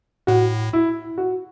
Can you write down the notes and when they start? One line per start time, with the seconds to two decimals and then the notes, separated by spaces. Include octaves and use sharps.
0.27 A2 F#4
0.73 E4
1.18 F#4